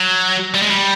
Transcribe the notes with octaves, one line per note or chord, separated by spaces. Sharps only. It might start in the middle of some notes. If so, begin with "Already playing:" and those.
Already playing: F#3
G3
G#3
G3